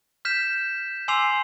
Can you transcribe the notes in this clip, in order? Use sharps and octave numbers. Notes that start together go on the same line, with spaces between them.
F6 G6 B6 E7
G#5 C6 D6 E6 C7 F7